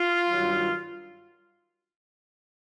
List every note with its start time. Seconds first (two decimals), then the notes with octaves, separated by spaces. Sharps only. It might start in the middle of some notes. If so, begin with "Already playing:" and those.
Already playing: F4
0.26 G2 D#3 F#3